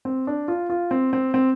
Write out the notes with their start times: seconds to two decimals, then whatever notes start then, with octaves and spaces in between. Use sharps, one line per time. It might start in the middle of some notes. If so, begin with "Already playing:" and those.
0.05 C4
0.27 D4
0.48 F4
0.70 F4
0.91 C4
1.13 C4
1.34 C4